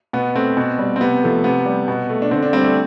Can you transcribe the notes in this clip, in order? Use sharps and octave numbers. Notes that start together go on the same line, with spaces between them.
B2 B3
A3 C4
B2
G3
C4
C3 B3
F3 A3
C3 B3
G3
B2
A3
D4
D3 C4
D4
G3 C4
A3